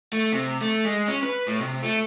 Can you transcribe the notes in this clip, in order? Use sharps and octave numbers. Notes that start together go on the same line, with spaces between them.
A3
C3
A3
G#3
C#4
B4
A2
C3
A3